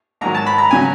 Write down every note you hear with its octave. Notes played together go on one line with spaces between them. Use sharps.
G#2 D#3 F#3 A#5
A5
B5
A#5
C#3 F#3 G#5